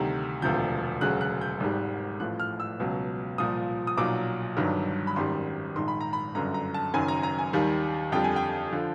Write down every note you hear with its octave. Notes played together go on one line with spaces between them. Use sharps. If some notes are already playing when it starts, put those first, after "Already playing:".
Already playing: D2 C3 D#3 G3
E1 D2 C3 F3 G6
E1 D2 C#3 F#3 F#6
F#6
G6
G#1 G#2 D#3 G3
A1 A2 F3 F#6
F6
E6
C#2 B2 F#3
C2 A#2 F3 D#6
D#6
B1 A#2 F#3 D6
G1 G2 D#3 F#3
B5
G#1 F#2 D#3 G3 C6
A#1 G#2 D#3 C6
B5
A#5
B5
G1 F#2 D3 A#5
A#5
A5
F#1 F#2 D#3 F#3 G#5
A#5
A#5
G#5
D#2 D#3 G3
F2 D3 G3 G5
G#5
G5
D3 F3